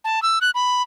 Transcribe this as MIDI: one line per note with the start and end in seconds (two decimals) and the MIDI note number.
0.04 0.22 81
0.23 0.39 88
0.41 0.51 90
0.55 0.82 83